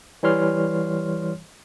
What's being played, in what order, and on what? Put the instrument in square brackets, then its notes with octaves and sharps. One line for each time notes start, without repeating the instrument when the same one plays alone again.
[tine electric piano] E3 G3 C#5 C6 F6